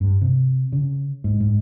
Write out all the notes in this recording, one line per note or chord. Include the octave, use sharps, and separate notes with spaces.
G2
C3
C#3
G#2
G#2